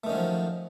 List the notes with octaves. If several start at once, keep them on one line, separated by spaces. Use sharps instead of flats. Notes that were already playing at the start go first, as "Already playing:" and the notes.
D#3 F3 F#3 A3 C#4